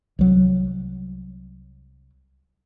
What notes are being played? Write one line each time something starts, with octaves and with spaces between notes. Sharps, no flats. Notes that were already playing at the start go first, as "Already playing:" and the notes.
C2 F#3